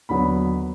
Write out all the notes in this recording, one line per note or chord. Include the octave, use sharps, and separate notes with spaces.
D#2 D3 F#3 B3 B5